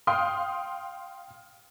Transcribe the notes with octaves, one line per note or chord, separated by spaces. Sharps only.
F5 G5 C6 D#6